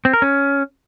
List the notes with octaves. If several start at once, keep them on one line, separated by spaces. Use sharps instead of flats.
C4
A#4
C#4